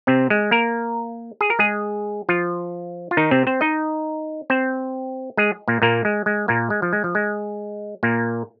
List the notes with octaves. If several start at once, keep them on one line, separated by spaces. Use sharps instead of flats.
C3 C4
G#3
A#3 A#4
G#4
A#4
G#3 G#4
F3 F4
F4
D#3 D#4
C3 C4
C4 C5
D#4 D#5
C4 C5
G#3 G#4
A#2 A#3
A#2 A#3
G#3
G#3
A#2 A#3
G#3
F3
G#3
F3
G#3
A#2 A#3